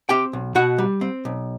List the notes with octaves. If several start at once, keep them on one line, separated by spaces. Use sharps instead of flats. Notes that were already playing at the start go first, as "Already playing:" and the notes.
C4 G4 G5
B1
B2 F#4 F#5
G3
C4
B1